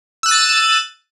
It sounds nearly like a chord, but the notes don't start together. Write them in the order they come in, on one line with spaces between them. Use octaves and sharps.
E6 F#6 D#7 A6